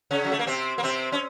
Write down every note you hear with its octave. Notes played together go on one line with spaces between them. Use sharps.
C#3 C#4
F#3
A3
A#3
C3 C4
A#3
C3 C4
C#4